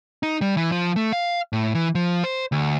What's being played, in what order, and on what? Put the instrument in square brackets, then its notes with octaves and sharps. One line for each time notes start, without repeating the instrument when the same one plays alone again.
[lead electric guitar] D#4
G3
E3
F3
A3
F5
A2
E3
F3
C5
D2